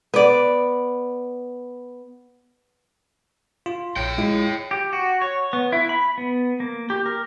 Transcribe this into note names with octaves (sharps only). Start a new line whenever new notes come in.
B3 D5
F4
A#1 C#5 G5
G#3 E4 F4
G4
F#4
C#5
B3
E4
B5
B3
A#3
G4
A#4